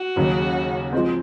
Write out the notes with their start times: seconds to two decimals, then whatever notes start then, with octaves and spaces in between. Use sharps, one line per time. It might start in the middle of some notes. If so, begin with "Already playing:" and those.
Already playing: F#4
0.16 D#2 C#3 F#3
0.92 F3 G#3 C4